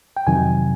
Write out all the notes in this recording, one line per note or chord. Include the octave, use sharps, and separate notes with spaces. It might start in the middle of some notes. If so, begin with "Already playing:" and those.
G5
F2 C3 D#3 F#3 G#5